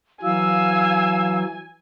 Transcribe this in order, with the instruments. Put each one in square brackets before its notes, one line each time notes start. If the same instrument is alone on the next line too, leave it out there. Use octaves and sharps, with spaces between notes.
[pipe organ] E3 F#3 [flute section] F5 E6 [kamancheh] G#5